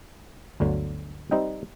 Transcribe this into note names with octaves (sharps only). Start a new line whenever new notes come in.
G1 D2 D3 F#3
G3 C4 D#4 D#5 E5 G5